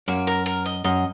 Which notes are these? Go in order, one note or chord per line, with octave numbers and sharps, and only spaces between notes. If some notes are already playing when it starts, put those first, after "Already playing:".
F#2 A#3
A#4
A#4
D#5
F#2 D#5